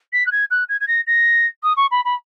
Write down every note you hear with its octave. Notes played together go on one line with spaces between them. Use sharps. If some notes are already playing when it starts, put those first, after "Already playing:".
B6
F#6
G#6
F#6
G#6
G#6
A#6
A#6
D#6
C#6
B5
B5